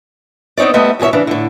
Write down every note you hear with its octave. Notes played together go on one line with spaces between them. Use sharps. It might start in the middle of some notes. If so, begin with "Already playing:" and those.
B3 C4 D#4 C#5 D5
G3 A3 B3 C5 D#5 E5
E2 B2 G#4 C#5 E5
C#3 E3 D4
A2 D3